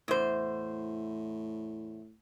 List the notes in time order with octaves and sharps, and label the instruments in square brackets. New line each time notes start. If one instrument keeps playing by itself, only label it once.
[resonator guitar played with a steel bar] E2 C5 [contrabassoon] A2